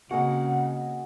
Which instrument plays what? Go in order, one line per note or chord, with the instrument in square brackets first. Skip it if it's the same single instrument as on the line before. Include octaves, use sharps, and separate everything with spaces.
[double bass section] C#3 [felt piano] A#3 C4 [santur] F#4 G#4 D#5 [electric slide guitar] F5 F#5